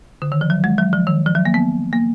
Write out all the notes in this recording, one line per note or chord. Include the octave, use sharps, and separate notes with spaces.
D3
D#3
F3
F#3
G#3
F#3
F3
D#3
F3
F#3
A#3
B3
A#3